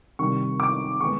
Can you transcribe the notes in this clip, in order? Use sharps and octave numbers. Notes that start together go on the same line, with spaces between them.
C3 D#3 G3 C#6
D6
D#3 G#3 B3 C#6